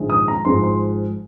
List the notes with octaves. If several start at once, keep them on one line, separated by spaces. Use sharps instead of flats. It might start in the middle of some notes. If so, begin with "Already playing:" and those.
Already playing: A#1 G#2 D#3 G#3
D#6
A#5
G#1 G#2 F3 G#3 C6
C6